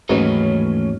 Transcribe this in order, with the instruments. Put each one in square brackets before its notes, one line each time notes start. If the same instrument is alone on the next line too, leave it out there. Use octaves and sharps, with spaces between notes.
[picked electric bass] D#2 G#2 F#3 [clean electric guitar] E3 A3 D#5 [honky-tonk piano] C#4 [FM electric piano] B4